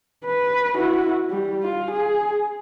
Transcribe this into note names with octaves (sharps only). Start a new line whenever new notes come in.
B4
E4 F#4
G3
F4
G#4